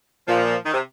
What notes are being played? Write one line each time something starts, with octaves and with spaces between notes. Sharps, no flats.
A#2 F3
D#3
C3